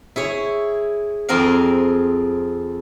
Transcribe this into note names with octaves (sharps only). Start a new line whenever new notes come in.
E4 G#4 C#5
F2 C4 G#4 A#4 F5